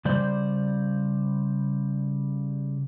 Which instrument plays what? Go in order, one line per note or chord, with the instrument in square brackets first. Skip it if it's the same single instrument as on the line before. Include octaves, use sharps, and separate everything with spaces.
[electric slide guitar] C#3 G3 C5 D5